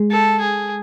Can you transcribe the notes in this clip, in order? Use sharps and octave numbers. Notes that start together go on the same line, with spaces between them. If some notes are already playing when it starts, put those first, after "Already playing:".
Already playing: G#3
A4
G#4